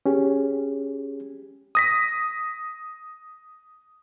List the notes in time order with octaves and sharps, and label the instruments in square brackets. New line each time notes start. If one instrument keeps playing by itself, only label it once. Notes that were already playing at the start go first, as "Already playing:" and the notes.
[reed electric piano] C#4 G4 G#4
[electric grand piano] D#6 A#6 B6